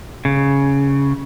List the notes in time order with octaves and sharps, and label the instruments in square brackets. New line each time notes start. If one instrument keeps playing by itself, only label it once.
[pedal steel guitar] C#3